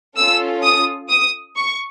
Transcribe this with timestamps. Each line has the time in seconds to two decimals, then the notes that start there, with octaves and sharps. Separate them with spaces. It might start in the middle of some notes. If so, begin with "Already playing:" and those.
0.16 C#4 F4 A4 E6
0.63 D#6
1.10 D#6
1.56 C#6